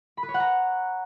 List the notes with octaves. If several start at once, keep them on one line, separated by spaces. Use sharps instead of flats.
B5
B4
C#5
F#5
A#5